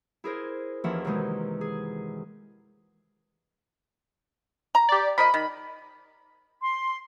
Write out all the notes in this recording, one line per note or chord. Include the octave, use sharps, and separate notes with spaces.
E4 G#4 A#4 C5
D#2 E3 F3 C#4 E5 F#5
F#2 C3 D#3 E3 G#3 D#4
G#4
A#5
G4 D5
F3 A#4 D#5 B5
D#3
C6